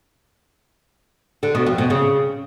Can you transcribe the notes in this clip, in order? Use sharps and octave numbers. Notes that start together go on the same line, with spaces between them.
D3
B2
F2
B2
C#3